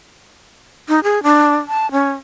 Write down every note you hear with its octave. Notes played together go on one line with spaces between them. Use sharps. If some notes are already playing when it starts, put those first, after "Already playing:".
D#4
G#4
D4
A5
C#4